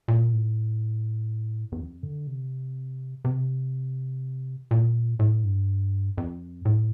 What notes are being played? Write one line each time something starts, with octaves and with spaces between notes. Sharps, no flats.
A#2
A2
E2
F2
D3
C3
C3
A#2
A2
G2
F2
A2